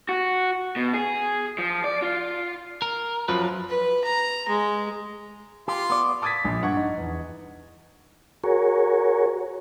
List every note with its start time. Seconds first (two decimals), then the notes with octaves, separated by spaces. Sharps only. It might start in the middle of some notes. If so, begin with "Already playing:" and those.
0.09 F#4
0.76 B2
0.94 G#4
1.58 F3
1.84 D5
2.02 F4
2.82 A#4
3.28 F#2 F3 F#3 B4
3.69 B4
4.04 A#5
4.48 G#3
5.68 F4 G4 C6
5.90 B3 D5
6.22 A5 D6 D#6 G#6 A6 B6
6.45 A#1
6.62 G2 F#5 C#6 G#6
6.77 D#4
6.97 E2
8.44 F#4 G#4 A#4 C#5